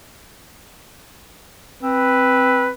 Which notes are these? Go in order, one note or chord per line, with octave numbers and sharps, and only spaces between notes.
C4 B4